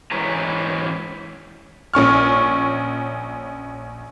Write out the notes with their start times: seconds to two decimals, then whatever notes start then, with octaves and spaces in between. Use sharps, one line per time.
0.12 G#2 E3 C#4 B4 A#5
1.94 A#1 C#4 C#6 F6